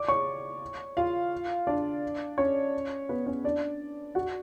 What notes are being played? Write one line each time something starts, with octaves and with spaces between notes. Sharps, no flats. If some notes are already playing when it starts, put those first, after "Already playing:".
Already playing: D5 D6
C#5 C#6
F4 F5
D4 D5
C#4 C#5
B3 B4
C#4 C#5
D4 D5
F#4 F#5